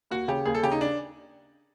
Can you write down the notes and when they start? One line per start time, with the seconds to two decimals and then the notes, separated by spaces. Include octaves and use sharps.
0.11 D#2 F#4
0.28 C#3 G4
0.45 D#2 G#4
0.55 A4
0.63 C#3 G4
0.72 D#4
0.81 D4